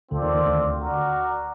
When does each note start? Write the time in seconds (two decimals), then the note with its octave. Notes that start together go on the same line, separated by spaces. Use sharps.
0.11 D2 D3 C4 F4 A4 D5
0.22 D#2 D#3
0.35 D#2 D#3
0.45 D2 D3
0.79 F#4 A#4 D5